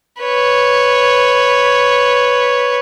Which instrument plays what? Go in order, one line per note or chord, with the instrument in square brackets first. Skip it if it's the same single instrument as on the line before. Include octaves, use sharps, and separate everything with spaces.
[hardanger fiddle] B4 C#5